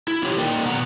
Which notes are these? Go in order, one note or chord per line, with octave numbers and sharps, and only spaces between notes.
E4
E4 F4 G4 C#5
A#3 D#4 D5 D#5 G5
B2 B3 D5 F#5 A#5